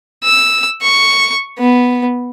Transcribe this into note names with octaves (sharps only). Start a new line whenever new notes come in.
E6
C#6
B3